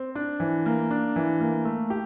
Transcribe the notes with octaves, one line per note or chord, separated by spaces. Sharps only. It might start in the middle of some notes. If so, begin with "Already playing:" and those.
Already playing: C4
D4
E3
A#3
D4
E3
A#3
A3
G4